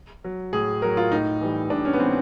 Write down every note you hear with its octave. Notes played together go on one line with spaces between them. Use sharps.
F#3
A2 G#4
F#3 A#4
F4
A2 D#4
E3 G3
A2 D4
C#4
B3
E3 G3 C4